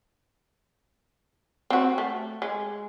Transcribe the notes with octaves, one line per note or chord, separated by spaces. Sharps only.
C4 F#4
A3
G#3